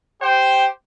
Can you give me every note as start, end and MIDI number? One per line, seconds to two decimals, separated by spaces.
0.22 0.67 67
0.22 0.67 72
0.22 0.67 79